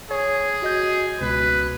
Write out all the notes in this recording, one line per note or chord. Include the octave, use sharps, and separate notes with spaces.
G#4 C#5
F#4 D#5 G6
C#2 B2 B4